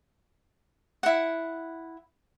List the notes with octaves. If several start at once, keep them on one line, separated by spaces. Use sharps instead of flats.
E4 F#5